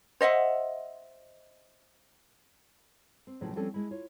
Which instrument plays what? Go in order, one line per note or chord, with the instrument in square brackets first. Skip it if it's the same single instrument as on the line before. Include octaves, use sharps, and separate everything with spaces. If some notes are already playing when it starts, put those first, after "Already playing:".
[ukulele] C5 D#5 E5 F#5
[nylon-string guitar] C4
E2 A2 C#3 F3 F#3
F3 G3 C4 C#4 A4
G#3 E4
F4 C#5